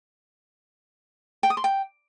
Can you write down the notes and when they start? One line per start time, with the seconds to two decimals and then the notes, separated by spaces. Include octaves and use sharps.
1.43 G5
1.50 D#6
1.57 C6
1.64 G5